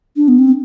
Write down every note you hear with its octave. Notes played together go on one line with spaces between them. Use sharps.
D4
B3
C4